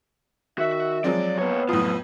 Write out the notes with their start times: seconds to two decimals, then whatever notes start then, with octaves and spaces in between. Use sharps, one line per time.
0.58 D#3 F#4 E5
1.04 F3 F#3 G#3 C4 D5
1.39 A#3 B3 C#5
1.69 F2 A2 F#3 F4 D#6